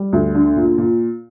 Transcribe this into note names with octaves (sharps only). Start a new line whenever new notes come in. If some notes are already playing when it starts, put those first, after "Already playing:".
Already playing: G3
D2
D3
A#2
A#2